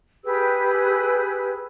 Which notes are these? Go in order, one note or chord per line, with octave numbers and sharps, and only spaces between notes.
G4 G#4 B4 E6